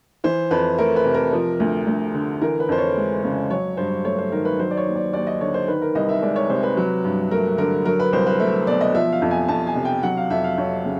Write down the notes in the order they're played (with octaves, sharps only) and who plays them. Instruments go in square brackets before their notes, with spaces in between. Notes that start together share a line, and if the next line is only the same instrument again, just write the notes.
[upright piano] E3 C5
F2 B4
A3 A#4
B4
C3
A#4
F3
D2
D2
D3
E3 A#4
B4
F2 C5
C#5
G#3
C#3
F#3 C#5
G2 C5
A3 C#5
C5
D#3 A#4
B4
F#3 C5
D5
C#5
D#2
D5
D#2 D5
D#5
D3 C#5
C5
D#3 B4
A#4
C2 D#5
E5
G#3 D5
C#5
C3 C5
B4
F#3
G2
A3 A#4
D3 A#4
F#3 A#4
B4
C2 C5
B4
A3 E5
B2 D5
D#5
F3 E5
F5
F2
G#5
F2 A5
G#5
C3
G5
F#3 F#5
F5
F2 E5
F5
F2 C#5
C#3